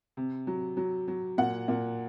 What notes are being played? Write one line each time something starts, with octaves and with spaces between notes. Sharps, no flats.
C3
F#3
F#3
F#3
A#2 F#5
A#2